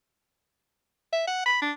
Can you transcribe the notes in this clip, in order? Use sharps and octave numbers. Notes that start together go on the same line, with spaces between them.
E5
F#5
B5
D4